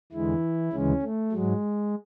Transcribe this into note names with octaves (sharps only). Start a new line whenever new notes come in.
E2 D3 E3 G#3 E4
D2 C#3 E3 G#3 C#4
A3
G#2 F#3 G#3